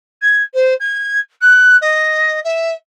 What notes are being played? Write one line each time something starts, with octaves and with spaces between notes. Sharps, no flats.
G#6
C5
G#6
F#6
D#5
E5